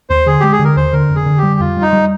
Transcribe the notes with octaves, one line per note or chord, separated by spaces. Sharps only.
D#2 C5
D3 G#4
G#3 G4
G#4
D3
A#4
D#2 C5
D3 A#4
F1
G#4
D3
G4
G3
F2 F4
G3
D#4
G3